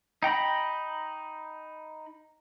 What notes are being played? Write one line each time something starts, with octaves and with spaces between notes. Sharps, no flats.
D#4 G5 A#5 B5